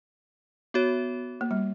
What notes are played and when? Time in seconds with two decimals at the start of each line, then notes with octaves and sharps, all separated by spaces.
0.74 B3 F#4 C#5
1.41 A#3
1.51 G3